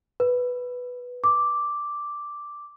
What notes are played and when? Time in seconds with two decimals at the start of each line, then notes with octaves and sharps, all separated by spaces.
0.20 B4
1.24 D6